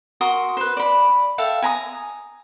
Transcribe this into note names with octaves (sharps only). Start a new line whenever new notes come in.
F#4 A#4 C6 D#6
B4 C5
D5 B5
A4 E5 F5 G5
G#5 A#5 B5 D#6